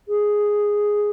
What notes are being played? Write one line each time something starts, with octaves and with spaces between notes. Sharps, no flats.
G#4